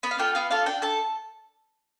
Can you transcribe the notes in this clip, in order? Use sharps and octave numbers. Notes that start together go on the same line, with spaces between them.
B3 B5
F5
D4 F4 A4 G5
B3 F5
D4 F4 A4 F5
D4 G5
A4 A5